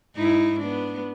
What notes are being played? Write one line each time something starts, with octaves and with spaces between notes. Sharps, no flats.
G#2 D#4 E4
B3 D4